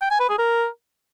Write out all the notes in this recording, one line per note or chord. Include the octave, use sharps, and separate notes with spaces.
G5
G#5
B4
G#4
A#4